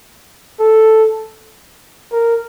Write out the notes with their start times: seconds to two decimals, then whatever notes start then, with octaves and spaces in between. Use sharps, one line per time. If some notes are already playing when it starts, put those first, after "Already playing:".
0.60 A4
2.12 A#4